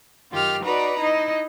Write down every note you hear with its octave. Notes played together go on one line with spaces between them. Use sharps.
F#2 D#3 F4 G4 F6
D#4 F#4 B4 D5 A#5
D#4 E4 D#5